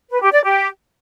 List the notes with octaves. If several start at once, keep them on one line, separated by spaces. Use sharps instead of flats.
B4
G4
D5
G4